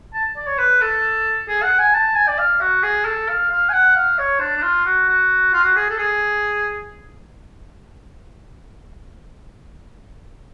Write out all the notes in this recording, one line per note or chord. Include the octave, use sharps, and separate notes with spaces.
A5
D5
C#5
B4
A4
G#4
F#5
G#5
A5
G#5
D5
F5
F#4
G#4
A4
F5
F5
G#5
F#5
F5
C#5
D4
D4
F4
F#4
F#4
F4
F#4
G#4
A4
G#4